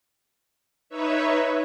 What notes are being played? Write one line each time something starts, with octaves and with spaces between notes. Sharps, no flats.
D#4 B4 C#5 E5